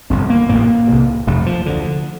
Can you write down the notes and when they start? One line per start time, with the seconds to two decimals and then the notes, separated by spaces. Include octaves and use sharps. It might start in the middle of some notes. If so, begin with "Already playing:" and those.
0.10 G1 F2 C3 C4
0.30 A#3
0.49 A1 A2 A#3
0.87 C2 C3
1.27 F1 F2 C3 A3
1.46 F3
1.66 D2 D3